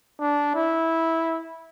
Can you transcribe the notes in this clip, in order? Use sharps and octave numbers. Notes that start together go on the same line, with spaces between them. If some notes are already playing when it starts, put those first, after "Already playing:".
D4
E4